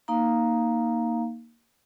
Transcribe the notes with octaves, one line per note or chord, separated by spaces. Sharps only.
A#3 D#4 F5 A#5